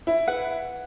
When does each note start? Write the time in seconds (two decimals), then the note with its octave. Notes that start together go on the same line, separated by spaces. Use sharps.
0.07 E4
0.27 B4 F#5